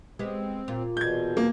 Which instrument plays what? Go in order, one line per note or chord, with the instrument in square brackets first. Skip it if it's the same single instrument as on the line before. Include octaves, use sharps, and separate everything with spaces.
[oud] G#3 B3 G4 [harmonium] C4
[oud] A#2 F4
[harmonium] E2 B2 [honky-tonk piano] G6 G#6
[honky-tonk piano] A#3